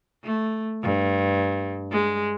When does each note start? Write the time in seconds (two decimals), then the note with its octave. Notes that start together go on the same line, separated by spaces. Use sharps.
0.24 A3
0.83 G2
1.91 G#3